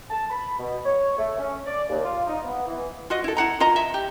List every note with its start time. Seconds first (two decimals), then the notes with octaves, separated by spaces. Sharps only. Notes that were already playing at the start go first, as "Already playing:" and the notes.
0.10 A5
0.30 B5
0.59 B2
0.86 C#5
1.19 A3
1.39 C#4
1.67 D5
1.89 D#2
2.04 F4
2.27 D#4
2.44 B3
2.67 E3
3.10 F4 F#4 D#5
3.24 E4 A4
3.37 E4 F#5 A#5
3.60 F4 D#5 A#5
3.76 E5
3.94 G4